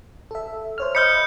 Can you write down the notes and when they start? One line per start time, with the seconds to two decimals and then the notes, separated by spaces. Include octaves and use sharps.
0.31 A4 E5
0.78 C5 C#5 F6
0.95 D#5 B5 F6 G6 C#7